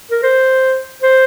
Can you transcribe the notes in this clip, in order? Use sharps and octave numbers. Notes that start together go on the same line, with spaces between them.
A#4
C5
C5